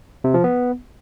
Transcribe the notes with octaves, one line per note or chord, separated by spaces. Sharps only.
C3
F3
B3